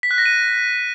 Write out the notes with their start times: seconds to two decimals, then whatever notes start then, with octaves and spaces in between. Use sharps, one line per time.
0.03 B6
0.11 F#6
0.18 A#6
0.26 D#7